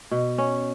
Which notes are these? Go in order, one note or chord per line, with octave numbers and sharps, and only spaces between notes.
B2
C#4